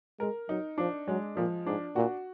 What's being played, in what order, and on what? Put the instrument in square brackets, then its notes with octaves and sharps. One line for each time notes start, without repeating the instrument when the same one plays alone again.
[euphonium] G#3 [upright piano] A#4
[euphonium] F#3 [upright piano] D#4
[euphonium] F3 [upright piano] D4
[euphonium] F#3 [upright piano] G#3
[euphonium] A#2 [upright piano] F3
[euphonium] G#2 [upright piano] D4
[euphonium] A#2 [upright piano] F#4